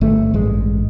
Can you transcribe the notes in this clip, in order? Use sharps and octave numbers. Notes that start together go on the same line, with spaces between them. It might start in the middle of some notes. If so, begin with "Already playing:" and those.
G1 A3
A1 G2 G#3